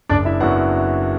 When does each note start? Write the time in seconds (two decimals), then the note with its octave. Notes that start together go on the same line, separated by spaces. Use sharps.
0.09 F#1 D4 D5
0.25 E4 E5
0.40 F#2 F#3 B3 E4 F#4 F#5